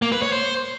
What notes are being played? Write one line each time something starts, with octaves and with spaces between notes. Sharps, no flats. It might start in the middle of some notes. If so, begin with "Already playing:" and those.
A#3
B4
C#5
C5